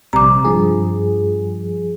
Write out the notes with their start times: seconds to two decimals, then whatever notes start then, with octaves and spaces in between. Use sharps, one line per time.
0.13 A#1 C3 G3 A#5 D6
0.45 G2 F3 G#4